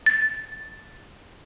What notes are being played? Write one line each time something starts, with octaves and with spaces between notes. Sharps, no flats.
A6